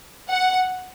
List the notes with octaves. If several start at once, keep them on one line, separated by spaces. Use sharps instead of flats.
F#5